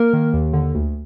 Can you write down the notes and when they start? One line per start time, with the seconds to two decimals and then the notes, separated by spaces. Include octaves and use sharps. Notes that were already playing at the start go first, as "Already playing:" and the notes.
Already playing: A#3 A#4
0.13 D#3
0.33 D#2
0.53 D3
0.74 D2